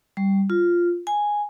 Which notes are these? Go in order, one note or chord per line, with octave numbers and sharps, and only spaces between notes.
G3
F4
G#5